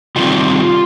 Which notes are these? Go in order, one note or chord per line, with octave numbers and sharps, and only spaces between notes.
C3 D#3 G3 C4 F4